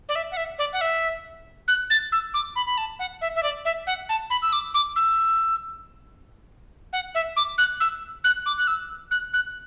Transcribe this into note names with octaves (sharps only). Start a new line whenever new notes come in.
D5
E5
F#5
E5
D5
F#5
E5
F#6
A6
E6
D6
B5
B5
A5
F#5
E5
E5
D5
E5
F#5
A5
B5
E6
D6
D6
E6
F#5
E5
D6
F#6
E6
F#6
D6
F#6
E6
F#6
F#6